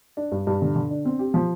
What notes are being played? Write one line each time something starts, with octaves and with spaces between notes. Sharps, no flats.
D4
G2
G2
D3
D3
D4
C4
G4
F3